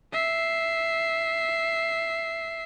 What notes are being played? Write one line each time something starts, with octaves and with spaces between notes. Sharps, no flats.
E5 C7